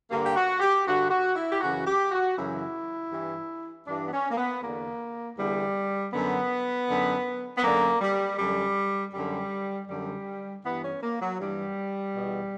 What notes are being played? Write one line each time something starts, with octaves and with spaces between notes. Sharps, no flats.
G2 D3 A#3
G4
F#4
G4
G2 D3 F#4
F#4
E4
G4
F#2 C#3 E3 F#4
G4
F#4
F#2 C#3 E3 E4
G2 E3
G2 E3 D4
B3
C#4
A#3
B3
E2 D3 A#3
E2 D3 G3
F#2 D3 B3
F#2 D3
B3
F#2 D3 A#3
G3
F#2 D3 G3
F#2 D3 G3
F#2 D3 G3
G2 E3 B3
C#4
A#3
F#3
G2 E3 G3
E2 B2